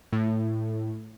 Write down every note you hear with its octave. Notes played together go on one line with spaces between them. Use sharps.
A2